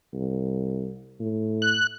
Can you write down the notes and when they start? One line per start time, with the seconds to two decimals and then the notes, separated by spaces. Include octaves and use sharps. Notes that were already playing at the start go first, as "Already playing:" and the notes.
0.14 C2
1.20 A2
1.62 F#6